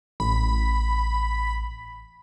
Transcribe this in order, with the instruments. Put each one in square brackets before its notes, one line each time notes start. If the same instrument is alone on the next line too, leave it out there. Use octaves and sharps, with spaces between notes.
[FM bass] A1 [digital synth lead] B5